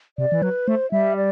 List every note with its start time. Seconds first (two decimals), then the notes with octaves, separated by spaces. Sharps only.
0.18 C3 D5
0.32 E3
0.42 F#3 B4
0.67 A3 C5
0.91 G3 E5
1.16 D5